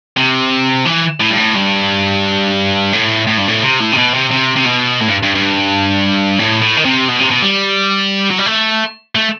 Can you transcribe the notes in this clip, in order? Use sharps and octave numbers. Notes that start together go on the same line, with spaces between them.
C3
E3
A2
G2
A2
G2
A2
A2
G2
A2
C3
A2
C3
B2
C3
C3
C3
B2
A2
G2
G2
G2
A2
A2
D#3
C3
B2
C3
B2
G3
F#3
G3
A3
A3